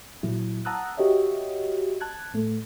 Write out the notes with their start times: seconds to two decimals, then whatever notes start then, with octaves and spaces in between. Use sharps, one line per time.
0.23 A#2 F#3 E4
0.65 F#5 A5 A#5 D#6 E6 F#6
0.97 F#4 G4 C#5 D#5 E5
2.01 A5 F#6 G#6
2.34 A2 A3